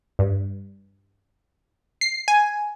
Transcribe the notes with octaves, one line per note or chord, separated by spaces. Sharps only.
G2
C7
G#5